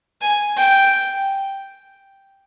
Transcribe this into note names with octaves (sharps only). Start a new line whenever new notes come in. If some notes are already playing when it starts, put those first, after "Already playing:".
G#5
G5